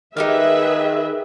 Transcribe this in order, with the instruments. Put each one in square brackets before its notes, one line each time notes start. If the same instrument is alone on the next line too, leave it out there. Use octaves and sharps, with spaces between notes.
[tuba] D#3 [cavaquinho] D#4 G4 F5 [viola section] G#4 B4 E5